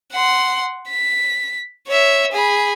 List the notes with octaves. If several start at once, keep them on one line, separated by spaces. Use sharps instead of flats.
F#5 C6
B6
C#5 E5
G#4 B5